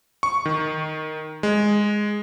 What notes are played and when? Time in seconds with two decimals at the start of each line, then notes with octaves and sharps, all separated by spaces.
0.23 C#6
0.46 D#3
1.43 G#3